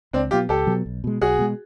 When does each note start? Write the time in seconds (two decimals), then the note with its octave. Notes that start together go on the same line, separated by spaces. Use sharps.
0.13 C#2 C4 D4
0.31 B2 F#3 B3 F4 G4
0.49 C#2 G4 A4
0.67 B2 F#3 B3
0.86 B1
1.04 B2 G#3
1.21 B1 F#4 G#4
1.38 B2 G#3